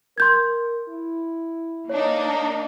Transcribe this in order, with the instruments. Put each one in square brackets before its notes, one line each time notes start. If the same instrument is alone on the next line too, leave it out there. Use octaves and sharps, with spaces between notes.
[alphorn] A#4 [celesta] C6 G6 G#6
[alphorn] E4
[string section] A#3 D4 D#4 [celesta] C#5